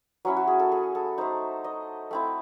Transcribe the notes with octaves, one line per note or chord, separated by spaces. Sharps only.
F#3 C#4 E4 C#5
F#4
G#4
A4
G#4
A4
A3 D#4 C5
D#5
A3 C4 E4